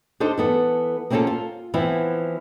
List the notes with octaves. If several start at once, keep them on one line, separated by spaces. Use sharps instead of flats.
D4 D#4 A4 C5
E3 B3 A4
A#3 C4 C#4 E4 F4 A4
F4
E3 F3 B3 C4 E4